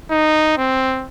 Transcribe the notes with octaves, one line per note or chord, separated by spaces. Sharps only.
D#4
C4